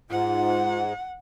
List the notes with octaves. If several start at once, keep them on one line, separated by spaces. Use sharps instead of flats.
G#2 F4 F#5